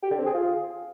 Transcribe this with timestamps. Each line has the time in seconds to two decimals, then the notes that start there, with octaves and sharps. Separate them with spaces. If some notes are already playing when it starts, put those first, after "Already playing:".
0.03 G4
0.11 D3
0.18 C4
0.26 G#4
0.34 F4